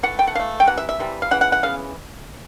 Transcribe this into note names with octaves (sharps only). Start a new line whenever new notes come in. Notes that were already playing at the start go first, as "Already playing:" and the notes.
E3 A3 F#5
G5
F#5
E3 A3 F5
G5
C3 E3 F#5
E5
E5
C3 E3 G3
F5
C#3 E3 F#5
F#5
F#5
C#3 E3 B3 F5